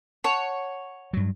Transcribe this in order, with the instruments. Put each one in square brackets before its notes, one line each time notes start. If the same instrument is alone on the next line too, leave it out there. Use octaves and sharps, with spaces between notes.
[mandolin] C#5 [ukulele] F#5 A5
[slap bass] G2 F#3